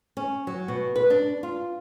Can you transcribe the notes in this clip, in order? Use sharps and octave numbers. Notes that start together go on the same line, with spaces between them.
C#4
F#3
B2
B4
D4
F4